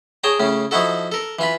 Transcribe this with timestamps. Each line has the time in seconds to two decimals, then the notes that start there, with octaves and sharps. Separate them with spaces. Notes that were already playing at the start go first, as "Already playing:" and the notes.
0.24 G#4 C#5 G5 A5 A#5
0.40 A2 C#3 C#4
0.71 F3 D#4 E4 F#4 A4
1.12 A4 A#4
1.39 E3 F4 B5